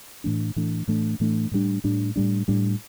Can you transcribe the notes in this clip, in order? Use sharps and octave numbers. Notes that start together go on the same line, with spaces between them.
A2 E3 A3 D4
A2 E3 A3 D4
A2 E3 A3 D4
A2 E3 A3 D4
A2 G3 D4
A2 G3 D4
A2 G3 D4
A2 G3 D4